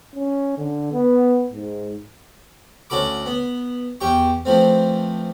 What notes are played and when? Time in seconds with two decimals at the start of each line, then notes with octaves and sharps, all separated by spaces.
0.15 C#4
0.58 D3
0.92 B3
1.52 G#2
2.90 D2 C#4 F#4 A4 B5 D6
3.26 B3
4.01 E2 G4 G5 C#6
4.45 E3 F3 A3 C4